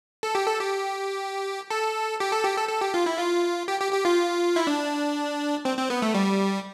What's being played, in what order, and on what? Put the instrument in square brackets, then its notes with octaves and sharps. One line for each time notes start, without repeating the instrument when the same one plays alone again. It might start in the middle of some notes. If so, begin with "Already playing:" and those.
[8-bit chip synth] A4
G4
A4
G4
A4
G4
A4
G4
A4
A4
G4
F4
E4
F4
G4
G4
G4
F4
E4
D4
C4
C4
B3
A3
G3